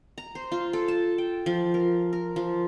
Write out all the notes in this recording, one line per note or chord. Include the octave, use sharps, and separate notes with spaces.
A#5
C5
F4
A4
A5
G5
F3
A#4
A#4
F3